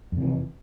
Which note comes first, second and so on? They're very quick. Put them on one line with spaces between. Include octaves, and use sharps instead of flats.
F2 C3 E3